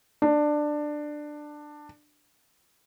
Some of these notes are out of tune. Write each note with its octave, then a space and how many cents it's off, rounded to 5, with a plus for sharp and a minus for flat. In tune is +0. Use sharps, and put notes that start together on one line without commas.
D4 +15